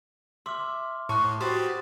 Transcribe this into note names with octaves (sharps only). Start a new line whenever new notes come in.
E5 C6 D6 F6
A2 A5 C#6 F#6
F#4 G4 B4 C5 D#6 A6